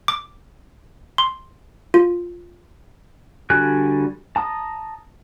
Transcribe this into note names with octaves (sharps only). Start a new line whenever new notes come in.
D6
C6
F4
D3 G3 F#4 G#5 F#6
A5 A#5 D#6